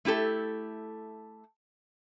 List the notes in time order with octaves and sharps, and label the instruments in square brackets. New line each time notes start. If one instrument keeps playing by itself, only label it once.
[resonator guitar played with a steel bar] A3 E4 G4 A4